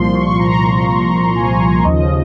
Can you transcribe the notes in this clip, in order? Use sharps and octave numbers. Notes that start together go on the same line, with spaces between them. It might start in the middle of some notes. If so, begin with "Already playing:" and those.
Already playing: C2 A#2 F3 C6
C#6
A#5
G#5
D#2 C#3 F3 D#5